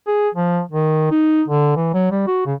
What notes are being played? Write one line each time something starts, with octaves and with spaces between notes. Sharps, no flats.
G#4
F3
D#3
D#4
D3
E3
F#3
G3
F#4
C#3